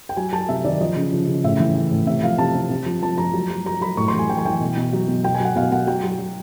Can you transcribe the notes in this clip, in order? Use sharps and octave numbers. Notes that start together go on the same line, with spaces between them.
G5
F#3 G#5
F#3 A5
C3 E5
D#3 D5
F3 D#5
C#3
F3
C#3
A2 E5
E3
E3
A2
C3 E5
F3 F5
C3 A5
C3
C3
F3
F3 A5
F3 A#5
F#3
F#3
F#3 A#5
F#3 B5
A2 C#6
C6
E3
G#5
E3 G5
G#5
E3 G5
B2
B2
F#3
B2
B2 G5
G#5
F#3 F#5
B2 F5
B2 F#5
F#3 G5
F#3
F#3